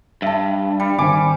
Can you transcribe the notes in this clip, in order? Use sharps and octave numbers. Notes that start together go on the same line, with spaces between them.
G2 E5 A5
G3
G#1 C5 G#5 D6